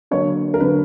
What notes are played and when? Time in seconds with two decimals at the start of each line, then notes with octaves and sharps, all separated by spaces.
0.11 D3 F#3 A#3 C#5
0.54 A#4
0.60 D3 F#3 A#3 B4